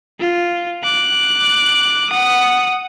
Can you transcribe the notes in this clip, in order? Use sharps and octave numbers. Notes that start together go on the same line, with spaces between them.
F4
D6 F#6
F#5 D#6